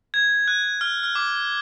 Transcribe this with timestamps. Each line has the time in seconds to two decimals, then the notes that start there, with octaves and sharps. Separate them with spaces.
0.14 G#6
0.48 F#6
0.81 F6
1.03 F6
1.15 D6